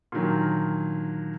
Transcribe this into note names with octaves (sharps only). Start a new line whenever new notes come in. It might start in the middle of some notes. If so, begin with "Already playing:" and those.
A#2 D3 D#3 F#3